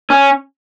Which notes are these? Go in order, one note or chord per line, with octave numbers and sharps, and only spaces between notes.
C#4